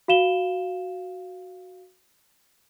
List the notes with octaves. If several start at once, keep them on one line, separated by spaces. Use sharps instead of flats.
F#4 F5 E7 G7